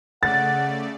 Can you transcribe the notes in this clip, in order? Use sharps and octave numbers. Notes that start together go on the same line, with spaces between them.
C#3 A3 D5 F#5 A6